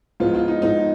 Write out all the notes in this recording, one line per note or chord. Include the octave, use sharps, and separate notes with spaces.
G#2 F3 B3 F4
F4
D#4
G#2 F3 B3 D#4